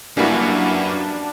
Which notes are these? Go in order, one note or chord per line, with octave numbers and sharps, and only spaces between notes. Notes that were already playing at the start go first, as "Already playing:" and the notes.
F#2 E3 G3 A#3 D4 E4 F#4